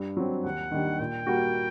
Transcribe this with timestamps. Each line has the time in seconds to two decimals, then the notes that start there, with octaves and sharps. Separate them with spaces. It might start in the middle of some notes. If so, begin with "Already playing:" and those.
Already playing: G2
0.17 F#3 C4
0.44 D#2 F#5
0.71 D#3 G3 A#3 D4
0.99 A#2 G5
1.27 G3 A#3 F#4